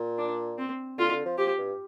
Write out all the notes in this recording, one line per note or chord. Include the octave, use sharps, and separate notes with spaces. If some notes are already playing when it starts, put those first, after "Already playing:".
Already playing: A#2
D4
C4
D3 F4
D3
F3
F3 G4
G2